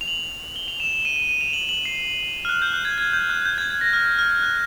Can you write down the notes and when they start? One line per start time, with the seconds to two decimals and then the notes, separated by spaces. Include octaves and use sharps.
0.01 F7
0.08 F#7
0.56 G7
0.68 F7
0.80 E7
0.93 E7
1.05 D#7
1.16 D#7
1.29 D#7
1.41 F7
1.53 F#7
1.69 F#7
1.85 C7
2.45 F6
2.49 F#6
2.62 G6
2.73 F#6
2.85 G#6
2.98 G#6
3.13 G6
3.30 F#6
3.42 F#6
3.45 G6
3.58 G#6
3.70 G#6
3.81 A#6
3.93 F6
4.19 F6
4.42 F#6